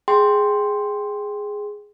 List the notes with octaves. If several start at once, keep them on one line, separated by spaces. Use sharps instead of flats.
G#4 G5 C6